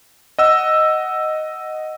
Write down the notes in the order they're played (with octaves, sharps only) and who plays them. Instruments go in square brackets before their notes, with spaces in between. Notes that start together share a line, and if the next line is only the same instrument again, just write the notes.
[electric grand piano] D#5 F#5 E6